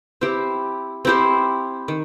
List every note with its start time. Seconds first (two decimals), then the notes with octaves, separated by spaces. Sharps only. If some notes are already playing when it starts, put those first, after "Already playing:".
0.21 C4 E4 G4 C5
1.05 C4 E4 G4 C5
1.88 D#3